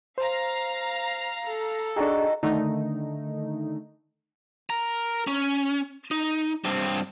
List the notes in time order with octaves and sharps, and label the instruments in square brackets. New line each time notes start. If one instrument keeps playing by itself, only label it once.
[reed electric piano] C5 [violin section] F5 A#5
[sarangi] A4
[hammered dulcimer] D#3 F#4 [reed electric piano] D4 G#4
[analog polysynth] D3 D#3 A3 D#4
[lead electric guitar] A#4 A#5
C#4
D#4
G2 C4